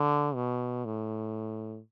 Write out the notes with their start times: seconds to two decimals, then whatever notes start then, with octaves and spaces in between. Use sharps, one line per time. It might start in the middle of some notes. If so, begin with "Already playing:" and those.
Already playing: D3
0.35 B2
0.85 A2